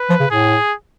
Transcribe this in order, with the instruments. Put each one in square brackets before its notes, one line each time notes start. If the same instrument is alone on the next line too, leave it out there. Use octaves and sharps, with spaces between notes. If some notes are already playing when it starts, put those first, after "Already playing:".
Already playing: [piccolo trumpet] B4
[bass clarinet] F3
C#3
[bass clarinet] A2 [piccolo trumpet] G#4